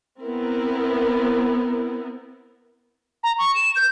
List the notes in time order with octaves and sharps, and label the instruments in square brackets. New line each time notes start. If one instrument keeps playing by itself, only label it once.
[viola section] B3 C4 E4 A#4
[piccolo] A#5
C#6
E7
G6